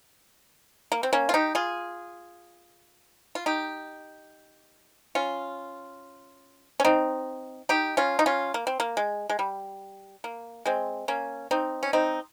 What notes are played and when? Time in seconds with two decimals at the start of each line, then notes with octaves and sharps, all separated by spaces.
0.92 A#3
1.03 C4
1.13 A#3 C#4
1.29 F4
1.34 D#4 G4
1.55 F4 G#4
3.35 F4
3.46 D#4 G4
5.15 C#4 F4
6.80 C#4
6.85 C4 D#4
7.69 D#4 G4
7.97 C#4 F4
8.19 D#4
8.26 C#4 F4
8.54 A#3
8.67 C4
8.80 A#3
8.97 G#3
9.30 G#3
9.39 G3
10.24 A#3
10.66 G#3 C4
11.08 A#3 C#4
11.51 C4 D#4
11.83 C#4
11.93 C4 D#4